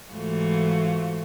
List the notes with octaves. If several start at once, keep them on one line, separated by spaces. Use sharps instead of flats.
G#2 E3 A3 F4 F#4